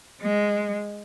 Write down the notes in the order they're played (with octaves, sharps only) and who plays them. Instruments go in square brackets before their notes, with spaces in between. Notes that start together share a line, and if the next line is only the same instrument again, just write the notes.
[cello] G#3